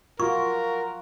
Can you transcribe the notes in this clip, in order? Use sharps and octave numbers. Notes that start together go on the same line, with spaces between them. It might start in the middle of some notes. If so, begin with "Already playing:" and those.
F4 F#4 A#4 C#6